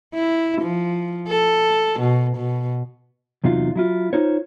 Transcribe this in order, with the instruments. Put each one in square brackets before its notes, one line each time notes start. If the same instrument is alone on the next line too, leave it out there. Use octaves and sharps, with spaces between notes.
[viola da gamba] E4
F3
A4
B2
B2
[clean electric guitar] E2 C3 F#3 D#4 F4
F#3 E4 F4
D#4 F4 C5 C#5